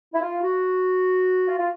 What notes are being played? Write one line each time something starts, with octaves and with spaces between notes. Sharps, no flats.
E4
F4
F#4
F4
F4